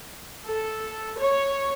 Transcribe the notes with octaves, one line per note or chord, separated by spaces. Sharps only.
A4
C#5